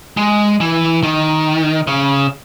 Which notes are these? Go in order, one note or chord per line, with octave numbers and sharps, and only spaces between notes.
G#3
E3
D#3
C#3